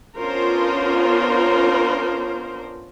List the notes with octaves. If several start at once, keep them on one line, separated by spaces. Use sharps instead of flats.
B3 C#4 D4 F4 A#4 C5